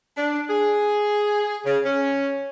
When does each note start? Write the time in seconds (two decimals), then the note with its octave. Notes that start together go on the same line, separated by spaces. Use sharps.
0.17 D4
0.49 G#4
1.65 C#3
1.85 C#4